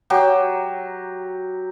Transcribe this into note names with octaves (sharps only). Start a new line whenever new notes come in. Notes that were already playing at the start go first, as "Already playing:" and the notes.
F#3 G4